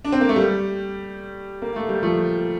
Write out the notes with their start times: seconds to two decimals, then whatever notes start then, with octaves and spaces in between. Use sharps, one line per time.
0.05 D4
0.12 C4
0.21 A#3
0.29 A3
0.36 G3
1.62 A#3
1.76 A3
1.89 G3
2.03 F3 A3